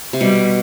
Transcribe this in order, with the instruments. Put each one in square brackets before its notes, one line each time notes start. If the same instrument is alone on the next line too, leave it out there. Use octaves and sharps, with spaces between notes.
[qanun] C3
[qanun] B2 [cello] G3